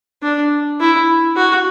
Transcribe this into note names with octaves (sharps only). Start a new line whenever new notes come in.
D4
E4
F#4